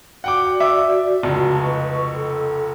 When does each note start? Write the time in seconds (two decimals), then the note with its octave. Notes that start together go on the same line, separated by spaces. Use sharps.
0.24 F#4 D5 F#5 G5 D6
0.60 E5 D6
1.23 F1 C#2 F#4 A5
1.63 B4 D#5 C#6
2.16 A4